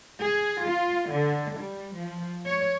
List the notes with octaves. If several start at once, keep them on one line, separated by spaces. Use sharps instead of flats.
G#4
F4
D3
G3
F3
C#5